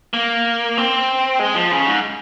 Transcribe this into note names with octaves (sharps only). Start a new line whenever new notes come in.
A#3
C4
G#3
F3
C#3
G#2